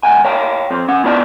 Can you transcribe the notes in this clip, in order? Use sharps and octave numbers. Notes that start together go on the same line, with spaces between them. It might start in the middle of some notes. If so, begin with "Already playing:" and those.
C#2 F#5 G#5
C#5 F5 G5 A5
F2 C4
C#4 F#5
B3 E4 F4 D5 G5 A5